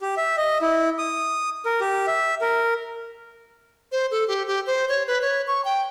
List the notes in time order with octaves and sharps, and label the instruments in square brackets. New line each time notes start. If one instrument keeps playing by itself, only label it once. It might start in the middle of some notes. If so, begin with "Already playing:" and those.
[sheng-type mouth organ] G4
E5
D#5
E4
D#6
A#4
G4
E5
A#4
[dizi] C5
A4
G4
G4
C5
C#5
B4
C#5
C#6
G5